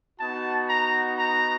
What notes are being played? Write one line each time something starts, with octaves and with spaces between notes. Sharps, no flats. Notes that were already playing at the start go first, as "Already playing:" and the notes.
B3 D#4 F#4 A5
A#5
A#5